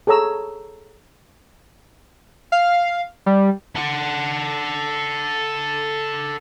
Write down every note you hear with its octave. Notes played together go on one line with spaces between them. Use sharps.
G#4 A4 C#5 A#5 E6
F5
G3
A4 F#5